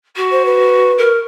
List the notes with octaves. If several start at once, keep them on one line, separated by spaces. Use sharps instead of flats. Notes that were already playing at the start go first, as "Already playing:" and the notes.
F#4
C5
B4
A#4